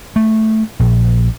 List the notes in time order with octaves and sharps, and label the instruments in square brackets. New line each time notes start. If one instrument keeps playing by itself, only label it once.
[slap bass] A3
A#1